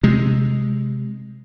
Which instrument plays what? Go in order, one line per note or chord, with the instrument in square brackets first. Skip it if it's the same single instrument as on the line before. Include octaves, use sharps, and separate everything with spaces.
[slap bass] C3 G#3